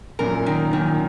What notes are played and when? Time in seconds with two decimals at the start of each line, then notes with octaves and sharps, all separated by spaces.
0.19 F#2 A#2 A#4
0.46 D#3
0.72 F#2 A#2 D#3